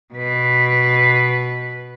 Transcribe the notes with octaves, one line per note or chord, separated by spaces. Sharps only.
B2 B4